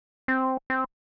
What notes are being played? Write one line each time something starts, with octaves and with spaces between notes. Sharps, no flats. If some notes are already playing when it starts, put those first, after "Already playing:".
C4
C4